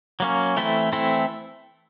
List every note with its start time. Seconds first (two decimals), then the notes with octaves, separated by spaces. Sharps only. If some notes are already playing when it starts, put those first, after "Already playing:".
0.20 F#3 A#3 C#4
0.57 E3 A3 C4 E4 A4
0.93 E3 A3 C4 E4 A4